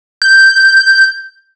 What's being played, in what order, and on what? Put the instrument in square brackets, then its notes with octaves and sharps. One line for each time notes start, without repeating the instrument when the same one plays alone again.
[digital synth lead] G6